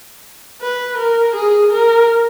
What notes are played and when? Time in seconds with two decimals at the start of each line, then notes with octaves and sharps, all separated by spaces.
0.61 B4
0.98 A#4
1.35 G#4
1.73 A#4